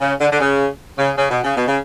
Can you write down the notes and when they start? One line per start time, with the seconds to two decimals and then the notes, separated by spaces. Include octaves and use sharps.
0.01 C#3
0.21 D3
0.32 D3
0.40 C#3
0.98 C#3
1.18 C#3
1.31 B2
1.44 C#3
1.57 B2
1.67 C#3